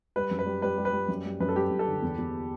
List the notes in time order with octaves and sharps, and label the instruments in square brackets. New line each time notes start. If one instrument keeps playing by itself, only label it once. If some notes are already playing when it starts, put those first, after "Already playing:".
[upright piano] G3 [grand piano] B4
[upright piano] F#2
[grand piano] B4
[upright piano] G3
[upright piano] G3 [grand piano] B4
[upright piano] G3
[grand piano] B4
[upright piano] G3
F#2
G3
[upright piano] F#2 [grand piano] B4
[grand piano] A4
[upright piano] G3 [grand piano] G4
[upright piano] F#2
[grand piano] A4
[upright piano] D3
E2
E2